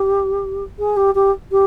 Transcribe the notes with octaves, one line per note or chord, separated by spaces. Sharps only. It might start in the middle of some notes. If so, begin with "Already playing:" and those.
Already playing: G4
G#4
G4
G4
G4